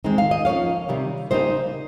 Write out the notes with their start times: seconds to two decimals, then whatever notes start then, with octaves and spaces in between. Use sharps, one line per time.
0.04 D#3 G#3 C4 D#4
0.18 F5
0.31 D#5
0.45 F3 A#3 C#4 C#5 F5
0.89 C3 D#3 G3
1.31 C#3 G3 A#3 D#4 C5 D#5